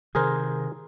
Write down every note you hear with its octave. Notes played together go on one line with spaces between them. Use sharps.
C3 D#3 G#4 A#4 C5